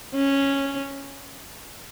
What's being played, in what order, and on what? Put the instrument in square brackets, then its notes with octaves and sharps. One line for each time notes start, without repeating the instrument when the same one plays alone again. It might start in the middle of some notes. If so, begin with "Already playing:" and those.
[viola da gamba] C#4